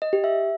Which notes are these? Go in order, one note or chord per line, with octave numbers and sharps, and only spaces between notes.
D#5
G4
E5